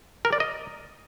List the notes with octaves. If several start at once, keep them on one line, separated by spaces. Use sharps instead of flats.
A#4
D5
D#5